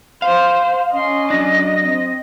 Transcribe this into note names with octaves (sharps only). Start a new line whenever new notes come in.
C5 F5
C#4 D#5 C6
F#3 D4 A#6
C4